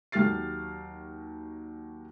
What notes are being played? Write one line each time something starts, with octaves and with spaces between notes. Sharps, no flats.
D#2 F#3 G4 F6 A6 C7